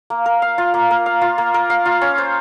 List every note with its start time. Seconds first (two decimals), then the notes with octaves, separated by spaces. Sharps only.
0.10 A#3
0.26 A#4
0.42 F5
0.58 F4
0.74 A#3
0.91 A#4
1.06 F5
1.22 F4
1.38 A#3
1.54 A#4
1.70 F5
1.85 F4
2.01 C#4
2.18 C5